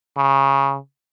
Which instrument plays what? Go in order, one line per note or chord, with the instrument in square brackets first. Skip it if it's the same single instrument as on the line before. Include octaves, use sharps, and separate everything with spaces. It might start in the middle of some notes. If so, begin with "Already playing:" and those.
[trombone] C#3